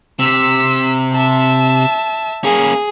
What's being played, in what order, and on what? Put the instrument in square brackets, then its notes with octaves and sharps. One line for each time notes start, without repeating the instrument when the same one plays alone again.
[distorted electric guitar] C3 [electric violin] E6 B6
[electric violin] E5 A5
[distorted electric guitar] A#3 C#4 [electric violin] G#4